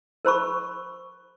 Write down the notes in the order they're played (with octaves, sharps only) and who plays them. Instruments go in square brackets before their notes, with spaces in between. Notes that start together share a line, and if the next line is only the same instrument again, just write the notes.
[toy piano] A#4 C5 B5 C#6